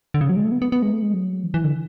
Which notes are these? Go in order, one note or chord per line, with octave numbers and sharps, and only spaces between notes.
D3
C#3
F#3
G#3
A3
B3
B3
B3
G#3
A3
G#3
F#3
E3
E3
D3